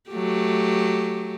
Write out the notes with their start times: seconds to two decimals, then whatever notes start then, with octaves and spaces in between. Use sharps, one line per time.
0.10 F#3 A3 G4